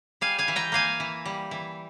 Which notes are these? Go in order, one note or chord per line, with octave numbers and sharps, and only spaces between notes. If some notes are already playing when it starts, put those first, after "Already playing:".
G3 F5 G#5
F5 G#5
E3
G5 A#5
A#3 F5 G#5
E3
G3
E3